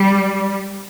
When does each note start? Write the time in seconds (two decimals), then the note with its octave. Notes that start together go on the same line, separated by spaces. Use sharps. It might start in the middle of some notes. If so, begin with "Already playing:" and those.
Already playing: G3